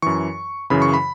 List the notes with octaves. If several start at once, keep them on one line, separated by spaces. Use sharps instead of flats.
F#2 E3 C#6
F#2 C#3 E3 B5
C#6
B5